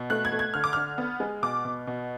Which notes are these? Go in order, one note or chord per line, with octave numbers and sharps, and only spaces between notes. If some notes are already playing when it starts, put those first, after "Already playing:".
Already playing: B2
A3 F#6
G#6
A3
G#6
D3 F6
D6
D3 F6
B3
G#3
B2 D6
B2
B2